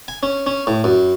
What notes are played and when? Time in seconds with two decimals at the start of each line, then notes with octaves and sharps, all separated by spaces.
0.08 G#5
0.23 C#4
0.46 C#4
0.67 A2
0.84 F#2